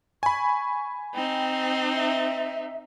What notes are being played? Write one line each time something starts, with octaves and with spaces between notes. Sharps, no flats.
G#5 B5 C#6
C4 D#4 G5
E5